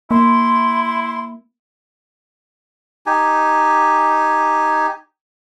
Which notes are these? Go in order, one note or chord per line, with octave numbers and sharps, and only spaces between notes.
A#3 E4 C6
D#4 G4 G#5